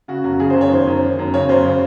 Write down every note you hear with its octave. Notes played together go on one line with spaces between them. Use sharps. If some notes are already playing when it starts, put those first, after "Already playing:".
C#3 F#4
F#2 F#4
C#3 G#4
C5
F#2
C#5
D#3 C5
F#2
D#3
F#2
C#3 C#5
F#2 C5
C#3